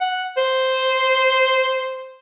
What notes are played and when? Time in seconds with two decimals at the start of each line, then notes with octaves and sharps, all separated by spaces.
0.01 F#5
0.37 C5